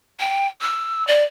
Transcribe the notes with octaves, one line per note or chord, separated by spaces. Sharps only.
G5
E6
D5